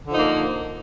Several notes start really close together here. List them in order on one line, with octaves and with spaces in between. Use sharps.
D3 F3 D#4 A#3